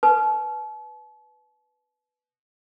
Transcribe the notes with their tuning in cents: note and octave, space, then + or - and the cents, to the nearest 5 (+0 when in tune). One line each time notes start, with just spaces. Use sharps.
B4 +0 A5 -40